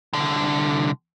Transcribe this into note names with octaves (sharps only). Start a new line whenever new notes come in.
C2 D3